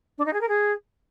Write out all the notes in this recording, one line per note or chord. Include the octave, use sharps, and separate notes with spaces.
D4
D#4
G#4
A#4
G#4